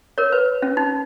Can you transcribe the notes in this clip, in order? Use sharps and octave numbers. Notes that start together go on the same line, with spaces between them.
A#4 C#5
B4
C#4
D#4